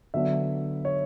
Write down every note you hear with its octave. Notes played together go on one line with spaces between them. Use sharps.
D3 F#3 B3 D4 E5
C#5